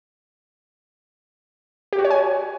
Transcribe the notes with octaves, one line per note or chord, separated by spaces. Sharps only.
G4
F#4
C#5
G#5